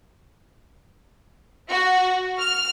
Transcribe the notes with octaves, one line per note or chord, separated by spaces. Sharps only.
F#4
F6